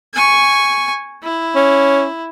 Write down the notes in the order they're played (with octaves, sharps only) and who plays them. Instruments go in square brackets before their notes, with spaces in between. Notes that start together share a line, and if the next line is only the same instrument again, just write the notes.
[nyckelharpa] G#5 C#6
E4
[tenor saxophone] C#4